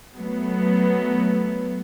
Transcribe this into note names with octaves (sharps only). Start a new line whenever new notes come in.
F#3 A3 B3